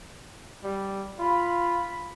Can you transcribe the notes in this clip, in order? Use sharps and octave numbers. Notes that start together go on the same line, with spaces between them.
G3
F4 B5